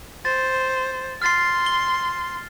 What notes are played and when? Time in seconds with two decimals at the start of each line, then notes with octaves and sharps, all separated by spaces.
0.25 C5 A6
1.22 C6 F6 A6 C7
1.66 G7